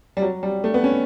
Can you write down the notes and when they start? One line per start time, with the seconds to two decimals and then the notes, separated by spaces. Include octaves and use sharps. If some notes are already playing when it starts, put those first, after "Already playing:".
0.17 G3
0.22 F#3
0.43 G3
0.64 A3
0.74 B3
0.84 C#4